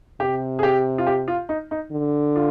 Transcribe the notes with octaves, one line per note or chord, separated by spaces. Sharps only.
C3 G4
G#4
G4
F4
G4
F4
D#4
D#4
D3
F4